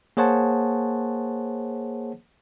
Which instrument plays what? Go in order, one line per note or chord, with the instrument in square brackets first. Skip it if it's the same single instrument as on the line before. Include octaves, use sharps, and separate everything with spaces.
[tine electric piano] A#3 G#4 C5 C#5 F#5 A5